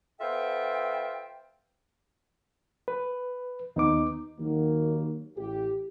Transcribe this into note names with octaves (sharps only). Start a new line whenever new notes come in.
B3 F4 A4 C5 E5 G5
B4
D#2 B3 D#4 D6
D#2 D#3 F#3 A#3
A1 G4